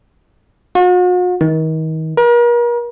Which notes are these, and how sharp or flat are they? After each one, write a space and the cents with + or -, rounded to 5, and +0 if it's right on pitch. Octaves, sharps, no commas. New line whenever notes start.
F#4 -45
D#3 +35
A#4 +40